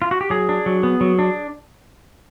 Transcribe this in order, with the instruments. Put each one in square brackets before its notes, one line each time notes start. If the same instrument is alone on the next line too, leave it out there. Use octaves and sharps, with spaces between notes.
[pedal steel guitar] F4
F#4
G4
F#3 G#4
D4
F#3
B3
F#3
D4